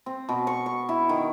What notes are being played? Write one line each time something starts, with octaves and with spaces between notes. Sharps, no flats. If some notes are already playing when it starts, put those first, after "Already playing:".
C4
B2
C#6
C#6
E4
D#3